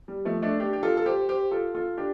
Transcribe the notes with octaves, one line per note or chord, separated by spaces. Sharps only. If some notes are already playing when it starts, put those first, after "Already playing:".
G3
F3 A3
A3 D4
D4 G4
G4
F4 A4
A4
G4 C5
G4 C5
F4 A4
F4 A4
D4 G4